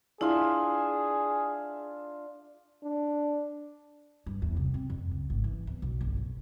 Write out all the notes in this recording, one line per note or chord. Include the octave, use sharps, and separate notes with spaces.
D4 E4 F4 G#4 E5
D4
G2
E2
C2
C4
F2
C#2
G#1
E3
E2
B1
G1
B2